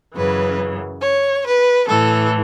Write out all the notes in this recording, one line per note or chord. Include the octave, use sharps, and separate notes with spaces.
F#2 C#3 E3 B4
C#5
B4
A2 E3 A4